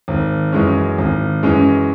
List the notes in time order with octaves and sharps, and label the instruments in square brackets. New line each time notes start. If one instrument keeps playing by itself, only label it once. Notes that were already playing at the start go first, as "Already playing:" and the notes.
[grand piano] G#1
F#2 E3 G#3 C#4
G#1
F#2 E3 G#3 C#4